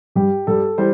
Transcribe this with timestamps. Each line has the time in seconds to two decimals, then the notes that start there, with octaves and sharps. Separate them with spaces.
0.15 G2 G3 G4
0.47 G2 G3 A4
0.78 E3 G3 C5